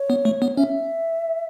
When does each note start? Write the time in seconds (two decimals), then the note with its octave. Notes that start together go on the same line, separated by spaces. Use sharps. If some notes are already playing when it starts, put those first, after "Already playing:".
Already playing: C#5
0.10 B3
0.25 A3
0.42 B3
0.57 C#4 E5